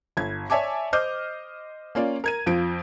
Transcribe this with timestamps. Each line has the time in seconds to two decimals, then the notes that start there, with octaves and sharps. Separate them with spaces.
0.17 G1 G#6
0.50 C#5 D5 E5 G#5 A5 D6
0.93 C5 D#5 D6 F6 G6
1.95 A#3 C#4 F4 D5
2.24 A#4 G#6 D#7
2.46 F2 F3 D7